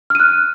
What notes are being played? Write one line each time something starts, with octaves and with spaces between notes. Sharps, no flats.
F6 F#6 D#7